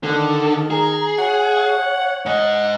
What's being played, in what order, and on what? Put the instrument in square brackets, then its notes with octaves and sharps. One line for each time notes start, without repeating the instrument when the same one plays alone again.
[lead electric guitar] D3 [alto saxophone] D#3 [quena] A4
[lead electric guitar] G#4 [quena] A#5
[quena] C#5 [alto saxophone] F#5
[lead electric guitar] G#2 D#5 [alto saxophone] F#5